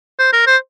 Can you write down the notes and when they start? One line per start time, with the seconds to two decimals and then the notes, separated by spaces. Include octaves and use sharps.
0.19 C5
0.33 A#4
0.47 C5